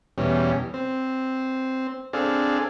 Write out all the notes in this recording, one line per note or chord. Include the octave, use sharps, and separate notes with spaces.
E2 B2 G3 C#4
C4
C4 D4 G#4 A4 F5